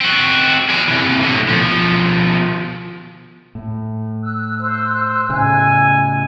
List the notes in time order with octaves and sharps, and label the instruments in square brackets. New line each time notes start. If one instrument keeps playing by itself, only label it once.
[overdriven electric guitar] C4 F#4
G#4 D5
C3 E3
A2 D3
B2 F3
[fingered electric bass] A2
[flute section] E6 F#6
[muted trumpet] C5
[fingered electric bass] A2 C#3 [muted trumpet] G#5